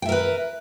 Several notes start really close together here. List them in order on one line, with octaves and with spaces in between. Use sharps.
G5 E5 A#4 B4